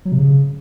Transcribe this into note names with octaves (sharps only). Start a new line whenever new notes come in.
F#3
C3
C#3